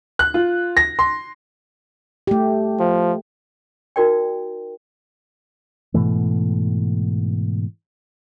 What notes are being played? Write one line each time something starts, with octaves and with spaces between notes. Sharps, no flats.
F#6
F4
A#6
C6
A3 G4
F3
D#4 F#4 A#4 D5 G5
G#2 B2 E3 A3